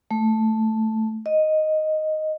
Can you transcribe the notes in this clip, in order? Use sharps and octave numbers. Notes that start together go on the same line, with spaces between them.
A3
D#5